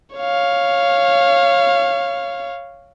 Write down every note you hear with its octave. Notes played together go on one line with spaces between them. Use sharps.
C#5 F5